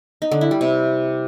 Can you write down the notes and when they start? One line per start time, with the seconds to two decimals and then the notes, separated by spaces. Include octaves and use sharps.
0.22 D#4
0.31 D3
0.41 E4
0.51 G3
0.61 C3